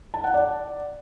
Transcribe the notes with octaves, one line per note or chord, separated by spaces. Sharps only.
A5
F#5
D5